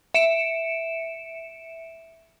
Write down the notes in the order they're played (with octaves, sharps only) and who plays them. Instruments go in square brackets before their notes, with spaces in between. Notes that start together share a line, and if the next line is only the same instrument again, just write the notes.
[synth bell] E5 C#7 D7 E7